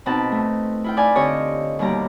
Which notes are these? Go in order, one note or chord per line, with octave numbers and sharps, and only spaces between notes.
B2 C4 D#4 B4 A5
A3
E4 F4 G5
B4 D5 F5 G#5
D3 C4 G4 C#5 D#5
D#2 B2 G3 G4 A#5